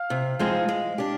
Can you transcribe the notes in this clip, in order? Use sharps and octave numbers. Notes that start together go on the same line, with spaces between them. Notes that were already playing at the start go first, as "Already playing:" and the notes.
Already playing: F5
C3
F3 G#3 C4 D#4
G#3
D4 G4